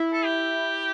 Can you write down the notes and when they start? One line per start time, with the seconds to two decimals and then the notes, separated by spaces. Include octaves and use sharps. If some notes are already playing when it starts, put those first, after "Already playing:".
Already playing: E4
0.13 A4
0.25 G4